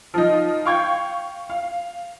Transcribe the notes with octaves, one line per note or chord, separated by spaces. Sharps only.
F3 D#4
F5 G5 C#6 G6 G#6
F5